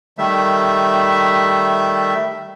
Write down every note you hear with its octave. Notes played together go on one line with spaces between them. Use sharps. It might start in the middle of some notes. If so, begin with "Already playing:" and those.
D#3 G3 A3 E5